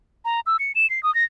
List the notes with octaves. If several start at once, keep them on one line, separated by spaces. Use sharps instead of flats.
A#5
E6
C#7
E7
C7
D#6
A#6